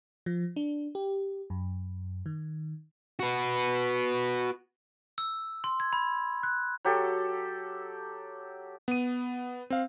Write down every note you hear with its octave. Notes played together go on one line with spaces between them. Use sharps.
F3
D4
G4
F#2
D#3
F#4 B4
E6
C6
G#6
B5
F#6
F#3 G4 A4
B3 D#7
C4 F5